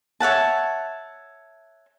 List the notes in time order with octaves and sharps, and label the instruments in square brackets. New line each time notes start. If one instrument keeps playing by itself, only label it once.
[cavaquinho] C#5 E5 F#5 A5